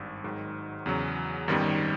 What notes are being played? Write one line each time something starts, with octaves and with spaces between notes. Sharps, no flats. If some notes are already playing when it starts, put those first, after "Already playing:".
Already playing: G#1 G2
G#2 D#3 F#3
E2 C#3 F#3
G#1 F#2 D#3 G3 B3